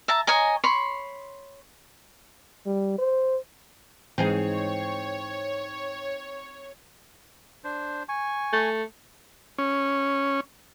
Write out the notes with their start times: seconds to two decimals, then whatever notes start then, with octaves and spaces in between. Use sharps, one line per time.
0.08 E5 A5 A#5
0.27 C#5 D#5 G#5 A#5
0.64 C#5 B5 C6
2.66 G3
2.98 C5
4.18 G#2 E3 C4 D#4 G#4 C#5
7.64 D4 C5
8.09 G#5 C#6
8.53 A3
9.58 C#4